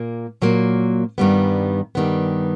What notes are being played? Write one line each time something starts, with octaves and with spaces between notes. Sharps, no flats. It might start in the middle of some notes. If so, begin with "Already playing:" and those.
Already playing: A#2 A#3
A#2 F#3 A#3
G2 D#3 G3 B3
G2 D#3 G3 B3